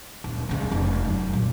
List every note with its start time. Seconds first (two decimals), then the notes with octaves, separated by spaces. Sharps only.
0.24 D#1
0.49 C2 C#3
0.71 F1 C#2
1.05 F#2
1.33 A#2 G3